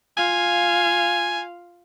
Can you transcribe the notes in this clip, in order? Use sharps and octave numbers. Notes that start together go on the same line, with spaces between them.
F4 F5 G#5